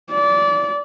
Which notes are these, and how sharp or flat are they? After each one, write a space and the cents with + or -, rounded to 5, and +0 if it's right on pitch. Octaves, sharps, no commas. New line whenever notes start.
D5 -25